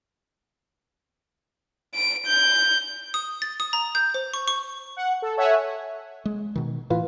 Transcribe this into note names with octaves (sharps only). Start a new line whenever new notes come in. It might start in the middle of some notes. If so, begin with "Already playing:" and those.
D7
G6
D#6
A6
D#6
A#5
G6
C5
C#6
C#6
F#5
A4
A4 C#5 E5 F#5 G#5
G#3
B2 D#3
A2 E3 F4 B4